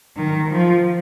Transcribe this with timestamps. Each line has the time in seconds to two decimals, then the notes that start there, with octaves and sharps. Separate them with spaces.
0.16 D#3
0.51 F3